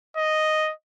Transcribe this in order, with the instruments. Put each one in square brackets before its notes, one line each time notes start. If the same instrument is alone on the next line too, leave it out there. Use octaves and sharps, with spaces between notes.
[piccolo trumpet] D#5